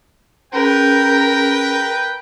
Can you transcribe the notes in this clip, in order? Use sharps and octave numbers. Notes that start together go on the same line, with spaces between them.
C#4 G#4 A#4 B4 G5